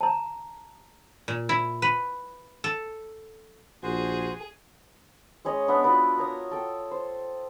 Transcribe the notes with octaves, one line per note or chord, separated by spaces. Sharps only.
A5 A#5
A#2
E4
B4
A4
A#1 F#4 G#4 C5
G#3 C#4 C#5 D#5
B3 D4 D5 E5
F4 F#4 B4 D5
A#4 C#5 D#6
A4 G5
C5